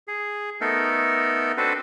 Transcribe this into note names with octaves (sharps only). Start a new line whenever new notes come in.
G#4
A3 B3 D#4 A4 A#4
C4 D4 F#4 A4 B4 C5